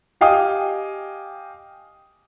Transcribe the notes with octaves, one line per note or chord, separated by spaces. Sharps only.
G4 D#5 F5 G5 G#5 D#6